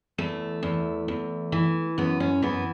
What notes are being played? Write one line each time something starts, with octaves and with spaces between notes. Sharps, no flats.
E2 A3
E2
E2
E3
F#2 B3
C#4
E3 B3